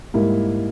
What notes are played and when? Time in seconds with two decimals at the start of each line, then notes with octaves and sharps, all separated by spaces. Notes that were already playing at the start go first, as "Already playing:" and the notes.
0.14 G#2 G3 A#3 E4